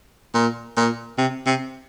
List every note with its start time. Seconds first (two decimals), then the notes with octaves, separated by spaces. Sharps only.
0.34 A#2
0.77 A#2
1.18 C3
1.46 C3